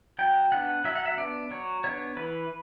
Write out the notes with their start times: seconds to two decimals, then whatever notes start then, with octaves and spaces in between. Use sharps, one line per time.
0.19 F#3 G5
0.52 B3 D4 F#5
0.84 F#3 E5
0.95 F#5
1.06 E5
1.17 B3 D4 D5
1.51 F#3 C#5
1.84 B3 D4 C#5
2.17 E3 B4